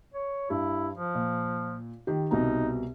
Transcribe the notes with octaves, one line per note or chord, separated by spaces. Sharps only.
C#5
G2 E4
F3
A#2
D#3 G4
C2 B2 D#4 A#5